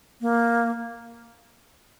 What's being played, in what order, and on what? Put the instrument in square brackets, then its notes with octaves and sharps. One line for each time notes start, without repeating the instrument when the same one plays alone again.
[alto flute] A#3